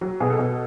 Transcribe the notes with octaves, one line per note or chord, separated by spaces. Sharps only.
F#3
B2 G#4
A4
B2